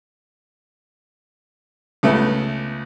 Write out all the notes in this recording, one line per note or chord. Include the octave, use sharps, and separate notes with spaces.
C#2 A3 B3